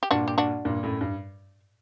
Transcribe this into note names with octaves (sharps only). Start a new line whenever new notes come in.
G4
G2 A#2 D4 F#4
G4
D4 F#4
G2 A#2
F#2 A2
G2